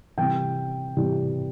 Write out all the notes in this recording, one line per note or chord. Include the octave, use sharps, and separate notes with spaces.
C3 E3 G3 G5
C3 E3 G3